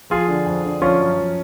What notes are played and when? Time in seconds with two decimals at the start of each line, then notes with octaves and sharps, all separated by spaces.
0.10 F3 F4 G#4
0.28 D3
0.46 F2
0.64 D3
0.82 F3 C#4 F4
1.00 F#2
1.18 F3